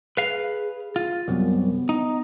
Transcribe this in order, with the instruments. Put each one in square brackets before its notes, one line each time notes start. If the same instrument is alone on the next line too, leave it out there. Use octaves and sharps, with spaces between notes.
[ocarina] G#4 [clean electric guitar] B4 F5
[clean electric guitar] F4
[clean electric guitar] C2 F#2 [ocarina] B3
[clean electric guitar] D#4